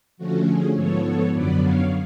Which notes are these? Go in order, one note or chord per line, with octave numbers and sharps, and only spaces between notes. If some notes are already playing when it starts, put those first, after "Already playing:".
D3 F3 A3 C#4 F#4
G#4
G#2 F3 B3 A4 C#5
A4 C#5
F#2 D3 F#3 B3 B4 D5
C#5 F5